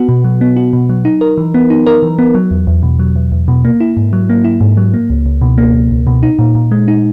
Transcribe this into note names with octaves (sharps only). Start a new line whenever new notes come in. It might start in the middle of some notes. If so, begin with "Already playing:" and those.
Already playing: B3 F#4
B2
F#3
B3
F#4
B2
F#3
D#4
A#4
E3
B3
D#4
A#4
E3
B3
F#3
E2
E2
B2
F#3
E2
E2
B2
A#3
E4
G#2
F#3
A#3
E4
G#2
F#3
A#3
C#2
C#2
B2
A#3
C#2
C#2
B2
D#4
A#2
A#2
G#3
D#4